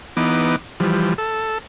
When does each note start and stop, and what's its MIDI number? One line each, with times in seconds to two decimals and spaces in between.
0.17 0.56 52
0.17 0.56 59
0.17 0.56 63
0.17 0.56 86
0.80 1.14 52
0.80 1.14 53
0.80 1.14 55
1.18 1.58 69